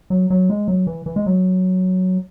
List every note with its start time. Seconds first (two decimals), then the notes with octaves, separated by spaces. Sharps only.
0.10 F#3
0.30 F#3
0.50 G#3
0.68 F#3
0.87 E3
1.06 E3
1.16 G#3
1.26 F#3